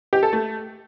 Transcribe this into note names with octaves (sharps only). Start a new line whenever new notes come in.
G4
A4
A3